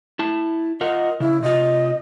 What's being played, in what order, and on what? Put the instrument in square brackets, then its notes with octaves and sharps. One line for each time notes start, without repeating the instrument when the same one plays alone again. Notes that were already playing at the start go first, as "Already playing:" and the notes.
[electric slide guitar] E4 A5
[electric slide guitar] F4 A#4 F#5 [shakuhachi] D#5
[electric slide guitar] C#3 [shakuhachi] E4
[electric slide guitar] C3 F4 [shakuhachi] D#5